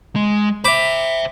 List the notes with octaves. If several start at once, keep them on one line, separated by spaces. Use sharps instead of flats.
G#3
C5 E5 B5 D6